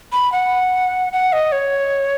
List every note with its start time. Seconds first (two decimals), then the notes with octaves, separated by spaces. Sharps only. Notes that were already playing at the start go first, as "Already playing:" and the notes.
0.12 B5
0.32 F#5
1.13 F#5
1.33 D#5
1.52 C#5